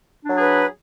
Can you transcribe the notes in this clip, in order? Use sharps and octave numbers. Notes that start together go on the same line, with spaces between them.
F#3 D4 G#4 B4